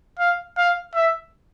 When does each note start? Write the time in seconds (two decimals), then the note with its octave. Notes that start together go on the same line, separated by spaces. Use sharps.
0.19 F5
0.57 F5
0.95 E5